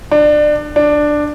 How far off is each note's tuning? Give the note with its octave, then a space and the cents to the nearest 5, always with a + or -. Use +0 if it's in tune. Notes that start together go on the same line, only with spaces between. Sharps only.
D4 +25
D4 +10